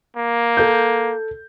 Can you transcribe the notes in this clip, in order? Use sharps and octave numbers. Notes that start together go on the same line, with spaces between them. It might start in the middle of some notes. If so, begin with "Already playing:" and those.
A#3
A4 G6